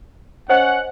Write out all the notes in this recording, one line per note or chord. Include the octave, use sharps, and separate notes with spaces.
C#4 C5 D#5 F#5